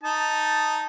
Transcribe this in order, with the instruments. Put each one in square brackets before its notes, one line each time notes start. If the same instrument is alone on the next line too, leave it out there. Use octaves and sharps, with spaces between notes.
[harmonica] D#4 A5